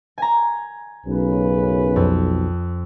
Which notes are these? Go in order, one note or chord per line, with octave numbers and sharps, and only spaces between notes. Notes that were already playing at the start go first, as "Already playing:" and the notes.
G#5 A#5
B1 F#2 C#3 B4
F2